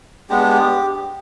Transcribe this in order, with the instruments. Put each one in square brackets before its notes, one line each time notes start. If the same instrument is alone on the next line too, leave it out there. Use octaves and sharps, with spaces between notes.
[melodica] G#3 B3 D4 G4